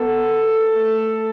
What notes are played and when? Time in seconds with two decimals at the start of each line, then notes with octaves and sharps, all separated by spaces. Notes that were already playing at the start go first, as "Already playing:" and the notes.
Already playing: B3 A4
0.74 A3